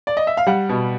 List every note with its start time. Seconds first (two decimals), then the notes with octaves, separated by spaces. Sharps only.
0.07 D5
0.17 D#5
0.27 E5
0.37 F5
0.47 G3 F#5
0.69 B2